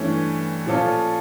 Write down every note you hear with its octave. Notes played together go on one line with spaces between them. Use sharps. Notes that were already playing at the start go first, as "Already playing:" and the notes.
Already playing: G2 E3 A3 C#4
A#2 F3 C#4 F4 A4